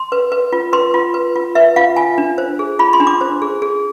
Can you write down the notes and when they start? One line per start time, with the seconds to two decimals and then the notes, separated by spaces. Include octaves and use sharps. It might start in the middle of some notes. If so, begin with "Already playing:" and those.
Already playing: C6
0.12 B4
0.32 B4
0.53 F4
0.73 B4 C6
0.94 F4
1.14 B4
1.36 F4
1.55 B4 E5
1.76 F4 F5
1.96 F4 G#5
2.18 D4
2.38 C5
2.59 G#4
2.79 F4 B5
2.93 C6
3.00 D4
3.07 D6
3.21 C5
3.42 G#4
3.62 G#4